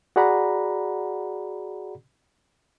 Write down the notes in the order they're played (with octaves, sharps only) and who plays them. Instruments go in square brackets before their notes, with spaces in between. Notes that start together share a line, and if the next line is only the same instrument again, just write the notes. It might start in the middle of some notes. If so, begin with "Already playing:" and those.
[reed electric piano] F#4 G#4 D5 F#5 A#5 B5